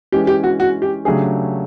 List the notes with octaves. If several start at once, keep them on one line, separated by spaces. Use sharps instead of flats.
E3 G#3 C#4 G4
G4
F#4
F#4
G4
C#3 F#3 A3 D4 G4 G#4